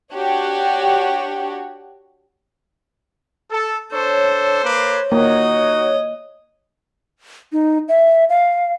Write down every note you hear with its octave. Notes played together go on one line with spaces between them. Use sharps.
D4 F#4 G4 C#5
A4
D4 A4 C5 C#5
A#3 B4 D6
A#3 D#4 F#4 D#5
D#4
E5
F5